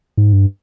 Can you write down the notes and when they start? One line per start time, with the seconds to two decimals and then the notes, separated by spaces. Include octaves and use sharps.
0.18 G#2
0.33 G2